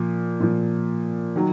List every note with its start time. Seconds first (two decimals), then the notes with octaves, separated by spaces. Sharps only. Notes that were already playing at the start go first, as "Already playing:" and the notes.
Already playing: A#2 F3
0.40 A#2 F3
1.36 D#3 F#3